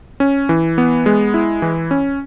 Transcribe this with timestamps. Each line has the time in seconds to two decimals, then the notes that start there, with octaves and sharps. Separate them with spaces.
0.20 C#4
0.49 E3
0.78 B3
1.06 G#3
1.34 E4
1.62 E3
1.91 C#4